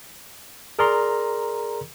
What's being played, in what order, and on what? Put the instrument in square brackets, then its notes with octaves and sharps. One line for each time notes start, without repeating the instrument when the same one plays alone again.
[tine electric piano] G#4 A#4 D5 A#5 C6